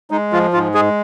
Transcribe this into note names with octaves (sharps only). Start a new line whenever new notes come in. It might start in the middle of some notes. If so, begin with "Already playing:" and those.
G#3 D#4
F3 F4
G#2 F4
G#3 G#4